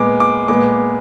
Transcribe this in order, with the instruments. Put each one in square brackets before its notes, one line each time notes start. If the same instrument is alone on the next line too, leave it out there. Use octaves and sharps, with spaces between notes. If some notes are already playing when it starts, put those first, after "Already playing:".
Already playing: [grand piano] A#2 G#3 B3 D6
D6
A#2 G#3 B3 D6